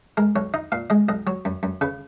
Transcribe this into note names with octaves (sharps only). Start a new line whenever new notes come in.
G#3 A#4
B1 C#5
D#4 D#5
A#2 F5
G#3 D#5
B1 D#5
F#3 C#5
F#2
F#2
C#3 B4